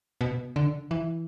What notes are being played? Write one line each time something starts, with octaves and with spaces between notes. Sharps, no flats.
B2
D3
E3